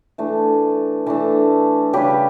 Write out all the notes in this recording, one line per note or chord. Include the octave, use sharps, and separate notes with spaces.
E3 A3 D4
E3 A3 D4
C#3 G3 C#4 G4 B4